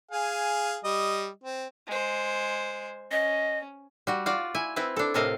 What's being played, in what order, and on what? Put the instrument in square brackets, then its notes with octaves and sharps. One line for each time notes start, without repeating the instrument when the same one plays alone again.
[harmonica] G#4 F5 G#5
G3 D#5
C4
[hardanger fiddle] G#3 C5
[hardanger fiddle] C#4 [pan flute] D#5
[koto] G3 F#4
F4 F#4 D5
E4 G#5
C4 E4 B4
D4 A4
A2 C3 A4 A#4 D#5 F5